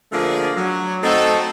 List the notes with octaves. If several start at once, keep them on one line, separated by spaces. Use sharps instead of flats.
D3 F3 A3 A#3 G#4 D5
F#3
A3 C4 D#4 F#4 A4